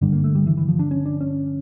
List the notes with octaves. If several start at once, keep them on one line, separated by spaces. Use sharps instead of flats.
G2 D3 G3
A#3
A3
G3
E3
E3
F3
D4
C#4
D4
C#4